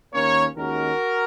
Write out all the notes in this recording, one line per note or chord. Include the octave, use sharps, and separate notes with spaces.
D#2 D#3 A#3 C#4 A#4 C#5
D#2 D#3 G#3 C#4 F#4 A#4